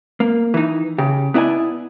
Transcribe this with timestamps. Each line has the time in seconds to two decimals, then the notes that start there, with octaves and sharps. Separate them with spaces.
0.20 A#3
0.54 E3 D#4
0.98 C#3 G4
1.34 B3 E4 D5 D#5 G#5